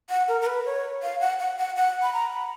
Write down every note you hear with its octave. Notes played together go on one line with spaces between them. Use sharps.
F#5
A#4
A#4
B4
C#5
F5
F#5
F#5
F#5
F#5
B5
A#5
B5